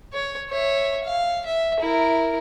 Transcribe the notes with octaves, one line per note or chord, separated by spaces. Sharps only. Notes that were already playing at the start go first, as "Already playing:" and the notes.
C#5
C#5 E5
F5
E5
E4 A#4